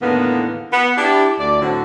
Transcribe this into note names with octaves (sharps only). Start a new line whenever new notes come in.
E2 A2 D3 D#3 A#3 B3
B3
D4 E4 G4
D2 D5
A2 D3 F#3 C4 F#4